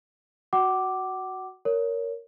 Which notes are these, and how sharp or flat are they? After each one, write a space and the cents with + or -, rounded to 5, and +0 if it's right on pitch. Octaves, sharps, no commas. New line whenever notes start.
F#4 +0 F#5 +30 D6 +0
A#4 +0 C#5 +20